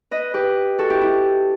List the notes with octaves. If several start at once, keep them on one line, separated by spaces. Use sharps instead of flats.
B4 D#5
G4 B4
F#4 A4
E4 G4
E4